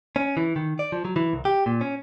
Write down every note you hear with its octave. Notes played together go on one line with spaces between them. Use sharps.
C#4
E3
D#3
D5
F3
F#3
E3
C2
G4
A#2
C#4